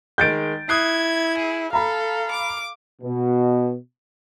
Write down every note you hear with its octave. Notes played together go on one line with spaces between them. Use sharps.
D#3 G#3 G6 A6 D7
E4 D#6 F#6 G#6 C7
G#4
A4 F5 A#5 B5
D6
B2